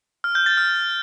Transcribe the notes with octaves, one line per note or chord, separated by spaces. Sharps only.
F6
G6
A6
F6